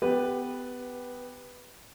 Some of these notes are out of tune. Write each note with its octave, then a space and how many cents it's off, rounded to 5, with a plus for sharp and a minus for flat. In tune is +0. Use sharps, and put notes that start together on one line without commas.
B3 +25 G4 +15 B4 -5